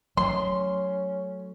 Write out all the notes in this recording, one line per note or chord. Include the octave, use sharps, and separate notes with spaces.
F#3 A3 C#4 C6